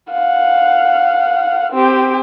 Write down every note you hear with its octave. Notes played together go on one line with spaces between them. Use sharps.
F5 F#5
C4 G4